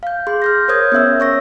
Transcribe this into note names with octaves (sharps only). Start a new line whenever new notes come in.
F5 G6
G#4 C6
F6 G6 A#6
A#4 C5 C#5 D#6 G6 G#6
B3 C#4 E5 E6
C#5 C#6 A#6